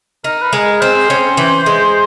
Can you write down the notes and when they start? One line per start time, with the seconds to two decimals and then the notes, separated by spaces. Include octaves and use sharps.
0.24 D#4 A#4
0.42 B4
0.53 G#3 A#4
0.82 C4 C5
1.10 C#4
1.37 E3
1.66 G#3